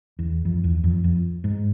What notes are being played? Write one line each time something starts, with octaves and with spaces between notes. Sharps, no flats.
E2
F2
E2
F2
F2
G#2